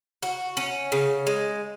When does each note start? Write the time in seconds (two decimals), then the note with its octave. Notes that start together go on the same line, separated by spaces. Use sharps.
0.23 F#4
0.57 C#4
0.92 C#3
1.27 G#3